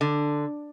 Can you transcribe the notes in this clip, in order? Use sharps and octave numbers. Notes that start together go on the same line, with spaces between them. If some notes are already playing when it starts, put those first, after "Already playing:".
D3